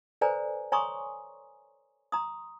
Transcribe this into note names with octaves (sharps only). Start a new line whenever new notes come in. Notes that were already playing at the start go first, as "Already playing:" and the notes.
A4 B4 C5 D5 G#5 A#5
C#5 G#5 A#5 C6 C#6 D#6
A#5 C6 D#6